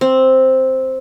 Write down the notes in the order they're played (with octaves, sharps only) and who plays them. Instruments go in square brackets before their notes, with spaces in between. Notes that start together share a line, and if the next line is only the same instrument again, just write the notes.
[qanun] C4